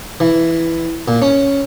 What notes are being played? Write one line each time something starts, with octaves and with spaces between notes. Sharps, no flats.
E3
A#2
C#4